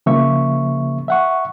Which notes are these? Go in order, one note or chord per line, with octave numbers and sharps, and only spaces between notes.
C#3 F3 A#3 E5 C#6
E5 F#5 C#6